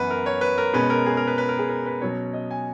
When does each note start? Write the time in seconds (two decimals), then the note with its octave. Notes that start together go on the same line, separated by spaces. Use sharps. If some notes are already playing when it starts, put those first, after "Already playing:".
Already playing: F#2 E3 B3 B4 F#5
0.10 A#4
0.26 C#5
0.41 B4
0.58 A#4
0.73 B2 G#3 C#4 B4
0.90 A#4
1.06 G#4
1.17 A#4
1.27 B4
1.38 B4
1.49 A#4
1.59 G#4
1.69 A#4
1.86 B4
2.01 B2 F#3 C#4 C#5
2.33 D#5
2.51 G#5